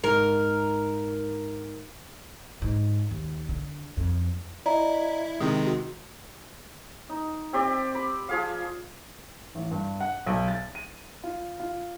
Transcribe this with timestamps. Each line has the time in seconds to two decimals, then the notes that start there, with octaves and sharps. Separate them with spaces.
0.04 G#2 A#4
2.62 G#2
3.11 D#2
3.49 D3
3.97 F2
4.66 E4 D5 D#5 A#5
5.40 C3 D#3 G#3 D#6
5.67 F#4
7.09 D#4
7.53 C4 G4 D5
7.95 B5
8.29 F3 G#4 F5
9.55 A1
9.71 G2
10.01 F#5
10.26 B1
10.48 A6
10.75 D#7
11.24 F4
11.60 F4